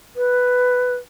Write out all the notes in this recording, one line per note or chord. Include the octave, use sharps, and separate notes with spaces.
B4